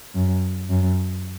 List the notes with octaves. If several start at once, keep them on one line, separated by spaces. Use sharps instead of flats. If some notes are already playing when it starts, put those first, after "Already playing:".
F#2
F#2